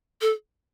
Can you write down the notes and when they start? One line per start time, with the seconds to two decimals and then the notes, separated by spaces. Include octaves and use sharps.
0.21 A4